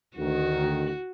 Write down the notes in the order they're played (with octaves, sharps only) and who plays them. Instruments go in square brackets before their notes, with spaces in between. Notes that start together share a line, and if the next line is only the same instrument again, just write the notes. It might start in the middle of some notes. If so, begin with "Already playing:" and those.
[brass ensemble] D2 D#3 [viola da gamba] F#4